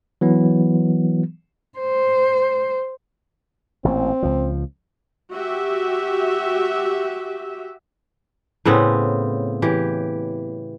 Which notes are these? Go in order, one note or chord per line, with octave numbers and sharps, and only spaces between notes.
E3 F#3 B3
C5
A1 A#2 C4
C#2 F3
F#4 G4 E5
A2 C#3 B3 C4
E3 G4